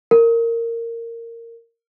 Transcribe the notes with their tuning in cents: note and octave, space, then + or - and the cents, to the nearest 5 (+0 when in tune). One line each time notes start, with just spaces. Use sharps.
A#4 -15